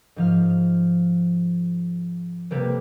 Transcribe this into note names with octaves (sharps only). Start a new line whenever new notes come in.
G#2 F3 F6
C3 G3 A#3 G4 A4 B4